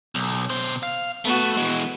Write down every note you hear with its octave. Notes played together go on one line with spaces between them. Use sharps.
B1
B2 C5
F5
A3 B3 F#4
E3 G#3 B3